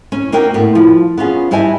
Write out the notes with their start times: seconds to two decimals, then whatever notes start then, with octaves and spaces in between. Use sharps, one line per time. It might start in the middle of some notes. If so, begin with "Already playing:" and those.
0.12 C#4
0.32 A#3 C#4 D#4 F#4 A#4 G5
0.54 A2 B3
0.75 F3
1.18 B3 C#4 F4 G#4
1.51 G2 E4 G4 D#5 G#5 A5